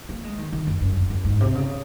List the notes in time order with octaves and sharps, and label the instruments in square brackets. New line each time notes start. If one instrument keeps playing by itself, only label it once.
[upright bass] A#3
G#3
D#3
D#3
F#2
F#2
F#2
F#2
G#2
C3
C#3